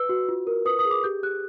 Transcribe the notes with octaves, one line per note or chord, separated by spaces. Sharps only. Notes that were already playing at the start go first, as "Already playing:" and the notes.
Already playing: B4 E6
F#4
F4
A#4
B4 D#6
D#6
G#4
D6
G4 G6
G4 F#6